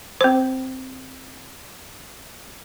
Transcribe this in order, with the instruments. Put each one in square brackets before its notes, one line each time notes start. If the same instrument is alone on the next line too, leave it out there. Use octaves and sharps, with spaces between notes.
[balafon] C4 C5